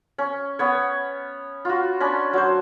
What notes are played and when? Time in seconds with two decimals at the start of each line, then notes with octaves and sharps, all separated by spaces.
0.18 C#4
0.59 B3 C#5
1.65 F4 F#4
2.00 C#4 D4 B5
2.33 F#3 C5